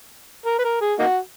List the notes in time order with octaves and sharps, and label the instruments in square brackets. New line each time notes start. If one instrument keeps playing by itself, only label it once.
[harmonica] A#4
B4
A#4
G#4
A#3 D#4 F#4